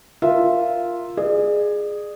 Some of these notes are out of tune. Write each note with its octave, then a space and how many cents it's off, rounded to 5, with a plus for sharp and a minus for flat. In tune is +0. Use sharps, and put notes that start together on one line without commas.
F4 +0 A#4 +0 E5 +0
G#4 +0 D5 +40